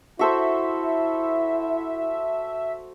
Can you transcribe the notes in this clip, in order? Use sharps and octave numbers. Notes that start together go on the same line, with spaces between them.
E4 F#4 A4 C5 E5